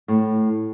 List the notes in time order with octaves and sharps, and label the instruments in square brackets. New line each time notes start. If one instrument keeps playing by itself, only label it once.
[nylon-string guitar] A2